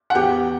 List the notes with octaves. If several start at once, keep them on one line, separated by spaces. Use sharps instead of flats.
F#5
E2 G4 G5